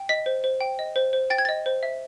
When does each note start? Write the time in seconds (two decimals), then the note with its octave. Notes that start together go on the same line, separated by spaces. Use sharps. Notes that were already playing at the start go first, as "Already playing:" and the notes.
Already playing: G5
0.09 D#5 B6
0.26 C5
0.44 C5
0.61 G5
0.79 D#5
0.96 C5
1.13 C5
1.30 G5 A6
1.38 G#6
1.45 D#5 A6
1.66 C5
1.83 E5